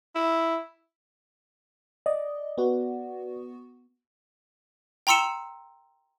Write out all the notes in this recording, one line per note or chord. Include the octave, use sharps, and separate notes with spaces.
E4
D5 D#5
B3 F#4
G5 A#5 C6 E6 C#7 E7